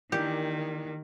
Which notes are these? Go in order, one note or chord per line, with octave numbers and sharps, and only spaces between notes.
D#3 E3 A#3 D4 G4